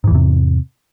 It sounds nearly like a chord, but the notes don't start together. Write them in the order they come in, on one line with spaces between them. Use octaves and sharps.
G#2 E3 E2 C3